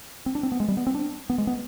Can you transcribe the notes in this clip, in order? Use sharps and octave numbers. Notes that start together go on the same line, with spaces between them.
C4
D4
C4
B3
G#3
G3
B3
C4
D4
B3
G#3
B3